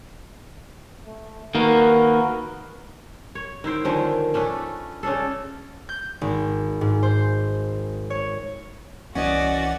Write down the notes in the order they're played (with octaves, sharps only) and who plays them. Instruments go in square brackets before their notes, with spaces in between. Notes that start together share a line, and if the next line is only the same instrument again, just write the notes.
[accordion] A3
[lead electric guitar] D#3 A#3 [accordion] F#4 A#4 B4
[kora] C#5
D#3 E4 C5 G5
D3 D#3 F3 C#4
A3 C#4 D4 B4
C#3 C#4 D4 A4
[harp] G6
G#1
G#2
C5
C#5
[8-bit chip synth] C2 E3 F#5 [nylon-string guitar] C#4 D#5 [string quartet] F#4 D5